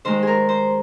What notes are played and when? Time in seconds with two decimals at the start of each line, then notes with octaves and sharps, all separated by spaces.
0.05 D#3 G#3 C5
0.23 G#4 A#4
0.49 C5